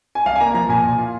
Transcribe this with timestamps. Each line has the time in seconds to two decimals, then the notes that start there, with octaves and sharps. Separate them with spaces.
0.15 G#5
0.26 C2 F5
0.36 G#5
0.40 A#3 A#5
0.54 F3 A#5
0.69 A#2 G#5
0.84 A#2
0.98 F4